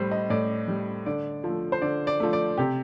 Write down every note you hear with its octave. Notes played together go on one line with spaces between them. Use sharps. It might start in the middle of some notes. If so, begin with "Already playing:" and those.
Already playing: A2 G3 C5
D#5
A2 D5
G3
D3 D5
F3
A3
C5
D3 D5
D5
F3 A3
D5
C3 G4